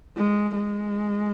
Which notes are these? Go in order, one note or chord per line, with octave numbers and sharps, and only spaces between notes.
G#3
G#3